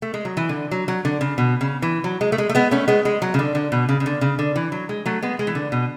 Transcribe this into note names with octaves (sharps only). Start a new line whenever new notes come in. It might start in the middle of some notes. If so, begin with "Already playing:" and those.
A3
G#3
F#3
E3
D3
F#3
F#3
D3
C#3
B2
C#3
E3
F#3
G#3
A3
G#3
A3
G#3 B3
A3 C#4
G#3 B3
G#3
F#3
C#3
D3
D3
B2
C#3
C#3
D3
C#3
D3
E3
F#3
G#3
F#3 A3
G#3 B3
G#3
E3
D3
B2